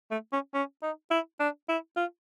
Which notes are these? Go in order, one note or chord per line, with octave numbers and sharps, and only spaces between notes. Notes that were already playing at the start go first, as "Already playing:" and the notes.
A3
C#4
C#4
D#4
E4
D4
E4
F4